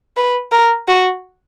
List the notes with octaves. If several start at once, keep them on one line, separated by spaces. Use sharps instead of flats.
B4
A#4
F#4